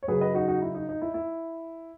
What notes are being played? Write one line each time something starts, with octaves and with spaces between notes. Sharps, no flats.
C#5
F#2 C#3 F#3 G#4 B4
B4 D#5
D#4 F#4
D#4 F#4
E4
D#4
D#4
E4
E4